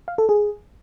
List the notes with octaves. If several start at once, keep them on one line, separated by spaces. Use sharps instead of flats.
F5
A4
G#4